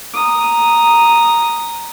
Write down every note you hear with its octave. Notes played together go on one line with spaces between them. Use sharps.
A#5 D#6